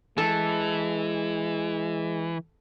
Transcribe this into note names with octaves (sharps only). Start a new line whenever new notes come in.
E3 G#3 A4